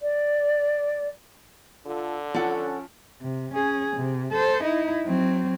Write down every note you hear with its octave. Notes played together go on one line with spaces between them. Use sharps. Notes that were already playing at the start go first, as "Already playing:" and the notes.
D5
D3 F4 A4
F3 C#4 A4 F#5
C3
C#4 G#4
C3
A4 C5
D#4 E4
F#3 C4